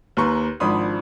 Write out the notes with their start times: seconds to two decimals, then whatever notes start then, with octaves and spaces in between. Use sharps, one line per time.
0.17 D#2 B4 A#5 C6 C#6
0.60 G#1 F3 D4 B5 C6 D#6